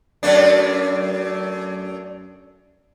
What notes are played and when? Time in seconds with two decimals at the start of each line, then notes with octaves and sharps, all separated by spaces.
0.23 F#2 A3 D4